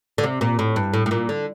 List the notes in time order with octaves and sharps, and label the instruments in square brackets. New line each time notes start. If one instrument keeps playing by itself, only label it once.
[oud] D3
C3
A#2
A2
G2
A2
A2
A#2
D3